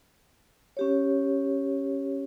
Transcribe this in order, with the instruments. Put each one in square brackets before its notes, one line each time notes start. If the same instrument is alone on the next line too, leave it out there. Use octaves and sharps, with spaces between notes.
[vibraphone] C#4 G4 C#5